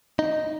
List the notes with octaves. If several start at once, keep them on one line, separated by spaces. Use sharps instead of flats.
D#4